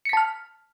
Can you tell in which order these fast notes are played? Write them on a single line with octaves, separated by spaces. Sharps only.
C#7 B6 A5 F6